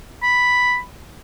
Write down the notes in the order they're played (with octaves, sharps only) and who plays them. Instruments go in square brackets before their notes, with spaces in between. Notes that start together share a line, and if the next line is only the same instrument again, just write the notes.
[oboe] B5